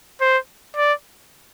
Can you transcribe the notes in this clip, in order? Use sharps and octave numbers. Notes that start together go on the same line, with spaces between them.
C5
D5